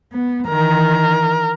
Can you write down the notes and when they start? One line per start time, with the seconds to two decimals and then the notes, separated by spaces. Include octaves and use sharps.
0.12 B3
0.48 D#3 E3 A#4